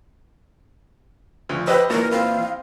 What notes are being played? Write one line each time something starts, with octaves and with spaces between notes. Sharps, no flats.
D2 F3
G4 B4 C5 D#5 G5 E6
A#2 E3 F#4 A#4
C4 E4 F5